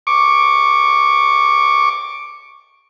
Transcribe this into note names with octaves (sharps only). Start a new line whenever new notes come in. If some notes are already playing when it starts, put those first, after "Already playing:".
C#6 D6